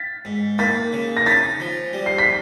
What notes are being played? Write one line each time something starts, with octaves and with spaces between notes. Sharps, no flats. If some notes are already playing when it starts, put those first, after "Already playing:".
Already playing: A6 B6
G#2
A#3 A6 B6
C#3
A#6
C#4 A6 B6
F3
G3
C7
B6